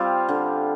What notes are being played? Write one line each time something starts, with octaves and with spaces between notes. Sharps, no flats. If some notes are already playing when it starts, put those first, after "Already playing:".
Already playing: G3 C4 F4
D3